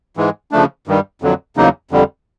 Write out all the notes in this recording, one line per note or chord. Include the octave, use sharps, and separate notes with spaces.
G#2 E3 G#3
C#3 F3 A3 D4
G2 D#3 G3
F2 D3 F#3
E2 C#3 F#3 A#3 D#4
F2 D3 G3